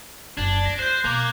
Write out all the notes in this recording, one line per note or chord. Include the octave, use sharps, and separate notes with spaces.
F#1 D4 G#6 A6
D2 A#6
C5 F#6 G6
B2 A#3 D6 F#6 G#6